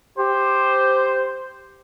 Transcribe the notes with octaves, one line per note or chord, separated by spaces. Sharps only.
G4 C5